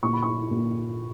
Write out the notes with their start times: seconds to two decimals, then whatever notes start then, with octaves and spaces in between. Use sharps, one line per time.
0.03 A#2 C#6
0.13 B5
0.22 C#6
0.51 A#2